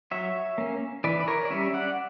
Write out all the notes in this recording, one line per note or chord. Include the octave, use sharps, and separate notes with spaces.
F#3 C#5 E5
A#3 C#4
E3 B4 D5
D5
A#4 C#5
D5
G3 C#4 C#5 E5
D5 F#5